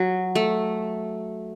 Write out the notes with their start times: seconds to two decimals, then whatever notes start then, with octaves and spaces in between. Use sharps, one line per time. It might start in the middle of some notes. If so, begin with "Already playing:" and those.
Already playing: F#3
0.35 A3